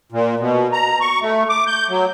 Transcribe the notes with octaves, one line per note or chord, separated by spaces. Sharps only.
A#2
B2
A#5
C#6
A3
D6
G6
F#3